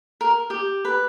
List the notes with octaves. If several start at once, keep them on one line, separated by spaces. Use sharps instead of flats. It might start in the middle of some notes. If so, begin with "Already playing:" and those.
A#4
G4
B4